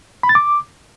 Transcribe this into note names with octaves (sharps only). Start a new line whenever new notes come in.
B5
A6
D6